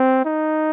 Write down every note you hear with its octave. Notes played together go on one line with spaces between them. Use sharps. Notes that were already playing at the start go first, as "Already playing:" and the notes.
Already playing: C4
D#4